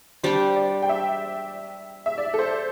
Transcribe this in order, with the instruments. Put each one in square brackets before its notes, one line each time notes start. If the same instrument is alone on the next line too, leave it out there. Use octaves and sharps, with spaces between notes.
[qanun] G3 D4 G4 [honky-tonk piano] C5
[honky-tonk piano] D5
G5
E5
E5
D5
A4
C5